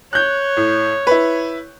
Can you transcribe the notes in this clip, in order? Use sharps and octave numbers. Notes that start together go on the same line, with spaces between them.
C#5 F#6 G6
A2
E4 B4